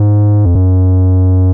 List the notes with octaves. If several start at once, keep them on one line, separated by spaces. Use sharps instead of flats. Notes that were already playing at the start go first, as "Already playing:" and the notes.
Already playing: G#2
F2
F#2